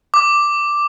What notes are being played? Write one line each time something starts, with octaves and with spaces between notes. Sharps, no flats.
D6